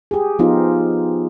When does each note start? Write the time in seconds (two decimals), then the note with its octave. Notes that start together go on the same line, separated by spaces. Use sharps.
0.11 G4 G#4
0.39 F3 B3 D#4 F4